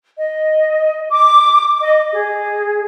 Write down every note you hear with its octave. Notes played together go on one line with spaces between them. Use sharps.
D#5
D6
D#5
G#4